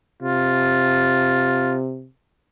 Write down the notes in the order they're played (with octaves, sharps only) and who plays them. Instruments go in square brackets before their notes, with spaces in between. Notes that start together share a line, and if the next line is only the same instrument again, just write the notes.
[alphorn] C3 [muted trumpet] F4